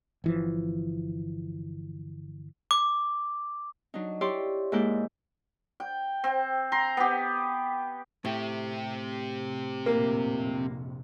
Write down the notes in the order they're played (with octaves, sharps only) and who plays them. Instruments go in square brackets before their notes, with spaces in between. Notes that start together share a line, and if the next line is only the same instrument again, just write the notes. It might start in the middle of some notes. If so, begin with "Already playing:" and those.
[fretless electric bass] G1 E3 F3
[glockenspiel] D6
[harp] F#3 D4 D#4
E4 G4 C#5 D5 C6
G#2 G#3 A#3 E4 D5 G6
[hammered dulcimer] G5
C4
A#5 C6
B3 G4
[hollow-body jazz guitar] A2 [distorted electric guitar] C4 G4
[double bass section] A#1 F2 C3 [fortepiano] A#3